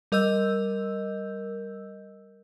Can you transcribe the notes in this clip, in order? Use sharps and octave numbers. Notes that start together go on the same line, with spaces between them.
G3 A#4 D#5 E6 G6